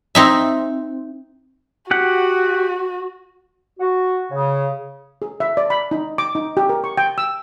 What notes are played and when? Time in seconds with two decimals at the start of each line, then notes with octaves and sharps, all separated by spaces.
0.15 C4 D#4 E5
1.91 F#4 G4 F#5
3.79 F#4
4.31 C#3
5.22 G#4
5.40 E5
5.57 D5
5.70 B5
5.91 D#4
6.18 D6
6.35 D#4
6.57 G4
6.69 A#4
6.84 C#6
6.97 G5
7.18 E6